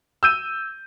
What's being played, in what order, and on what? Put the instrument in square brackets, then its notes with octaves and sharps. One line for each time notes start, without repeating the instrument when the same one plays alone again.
[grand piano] E6 G6 D#7